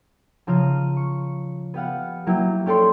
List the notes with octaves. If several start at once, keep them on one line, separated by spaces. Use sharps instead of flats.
C#3 F3 A#5 F6 D#7
C#6
B3 G4 F5 F#5
F#3 A#3 E4 G4
C#4 G4 A4 D5 C6